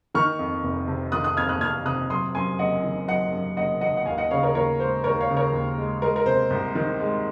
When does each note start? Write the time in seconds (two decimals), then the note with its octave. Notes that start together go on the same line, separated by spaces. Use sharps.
0.15 D#3 C#6 F6
0.39 F2
0.63 F1
0.88 C3
1.12 D#3 D#6 F#6
1.24 D#6 F#6
1.37 F2 F6 G#6
1.49 D#6 F#6
1.61 F1 F6 G#6
1.85 C3 D#6 F#6
2.10 F#3 C6 D#6
2.35 F#2 G#5 C6
2.59 F#1 D#5 F#5
2.83 D#3
3.08 F#3 D#5 F#5
3.33 F#2
3.57 F#1 D#5 F#5
3.81 D#3 D#5 F#5
3.97 F#5
4.06 D#2 F5 G#5
4.18 D#5 F#5
4.31 C#3 C#5 F5
4.43 A#4 C#5
4.55 D#2 A#4 C#5
4.80 G#3 C5
5.04 D#2 A#4 C#5
5.20 C#5 F5
5.29 C#3
5.37 A#4 C#5
5.52 D#2
5.78 G#3
6.02 G#3 A#4
6.16 A#4
6.26 C3 C5
6.50 C2
6.75 D#3
7.00 G#3